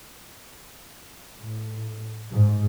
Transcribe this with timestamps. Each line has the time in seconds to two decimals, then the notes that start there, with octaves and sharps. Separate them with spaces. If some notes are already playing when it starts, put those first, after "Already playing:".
1.39 A2
2.31 G#2